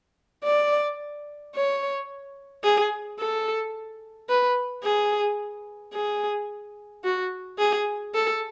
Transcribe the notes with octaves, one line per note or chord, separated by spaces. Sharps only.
D5
C#5
G#4
A4
B4
G#4
G#4
F#4
G#4
A4